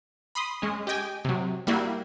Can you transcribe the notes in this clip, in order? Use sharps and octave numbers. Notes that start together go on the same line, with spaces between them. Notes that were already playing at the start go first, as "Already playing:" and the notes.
B5 C6 D#6
G#3 C#4
G4 D#5 G5 G#5
C3 F#3
G3 A#3 E4 F#4